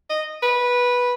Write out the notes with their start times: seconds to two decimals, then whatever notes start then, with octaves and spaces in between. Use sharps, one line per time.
0.10 D#5
0.43 B4